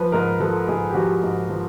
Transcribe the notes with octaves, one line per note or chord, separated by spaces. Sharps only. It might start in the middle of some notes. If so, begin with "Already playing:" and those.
Already playing: F3 B4
G#2 A#4
F3 A4
G#2 G#4
G4
F3 F#4
G#2
F3